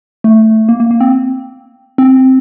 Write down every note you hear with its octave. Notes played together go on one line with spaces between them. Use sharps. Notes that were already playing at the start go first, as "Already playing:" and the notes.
A3
A#3
A#3
A#3
C4
C4